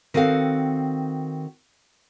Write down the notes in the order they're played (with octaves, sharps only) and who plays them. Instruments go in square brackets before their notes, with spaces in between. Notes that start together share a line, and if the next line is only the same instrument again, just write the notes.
[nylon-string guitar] D#3 C4 F#4 A4 F5 F#5